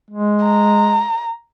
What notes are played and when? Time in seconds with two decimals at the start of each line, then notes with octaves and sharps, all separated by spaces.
0.11 G#3
0.43 A#5